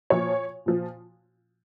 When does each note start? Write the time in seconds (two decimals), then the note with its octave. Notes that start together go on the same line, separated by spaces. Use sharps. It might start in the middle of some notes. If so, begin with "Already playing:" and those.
0.10 A#2 F3 C#5
0.66 A#2 F3